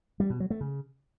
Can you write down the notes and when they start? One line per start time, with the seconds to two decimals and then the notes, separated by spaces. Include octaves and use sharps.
0.20 G3
0.30 B2
0.40 F#3
0.50 A3
0.61 C#3